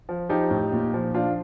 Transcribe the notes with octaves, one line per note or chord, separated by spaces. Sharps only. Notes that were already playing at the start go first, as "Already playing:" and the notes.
F3
F3 D#4 G4
A2
A#2
F3
F3 D4 F4